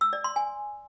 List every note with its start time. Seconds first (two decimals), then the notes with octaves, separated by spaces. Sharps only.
0.01 E6
0.13 D5
0.24 C6
0.36 G#5